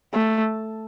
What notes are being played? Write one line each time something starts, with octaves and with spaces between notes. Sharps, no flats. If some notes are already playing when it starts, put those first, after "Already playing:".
A3